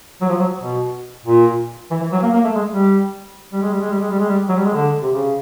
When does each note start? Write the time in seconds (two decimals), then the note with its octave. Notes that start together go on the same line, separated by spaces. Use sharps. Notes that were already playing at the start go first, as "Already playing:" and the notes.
0.21 F#3
0.29 F3
0.39 F#3
0.61 B2
1.26 A#2
1.91 E3
2.01 E3
2.12 F#3
2.23 A#3
2.34 A#3
2.44 A3
2.55 G#3
2.72 G3
3.52 G3
3.62 G#3
3.71 G3
3.81 G#3
3.90 G3
4.00 G#3
4.10 G3
4.19 G#3
4.29 G3
4.49 F#3
4.57 G3
4.65 G#3
4.73 D3
5.02 C3
5.13 C#3